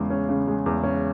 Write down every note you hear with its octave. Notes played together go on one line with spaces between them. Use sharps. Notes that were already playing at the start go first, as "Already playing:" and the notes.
Already playing: E2 C#3 G#3
C#4
C#3
G#3
E2
C#4